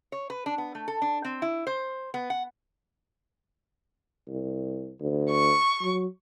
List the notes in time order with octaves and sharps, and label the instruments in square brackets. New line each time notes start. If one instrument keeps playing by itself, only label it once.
[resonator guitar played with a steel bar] C#5
B4
D4
B3
A3
A4
D4
C4
E4
C5
B3
F#5
[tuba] C2
D2
[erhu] C#6
[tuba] F#3